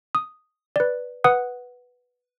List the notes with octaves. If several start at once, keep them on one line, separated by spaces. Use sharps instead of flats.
D#6
B4 D5
B4 F#5 D#6 F#6